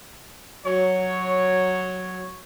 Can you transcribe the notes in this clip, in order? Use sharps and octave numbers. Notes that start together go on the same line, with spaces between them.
F#3 C#5